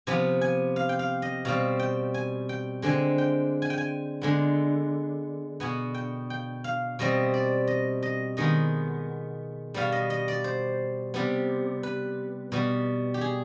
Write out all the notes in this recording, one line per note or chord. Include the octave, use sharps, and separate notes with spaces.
C3 F3 B3 G#5
G#5
F5
G5
F5
D#5
B2 G3 C4 F5
G5
G#5
G5
D3 G#3 C4 G#5
G5
G#5
G5
G#5
D3 G#3 B3
B2 B3 G#5
G5
G5
F5
B2 G3 C4 D#5
D5
D#5
D#5
D#3 G#3 B3 D#5
B2 G3 B3 F5
D#5
D#5
D5
C5
C3 G3 B3
B4
B2 G3 B3
G4
G#4